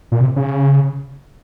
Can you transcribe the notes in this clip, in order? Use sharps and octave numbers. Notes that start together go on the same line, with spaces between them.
A#2
C3
C#3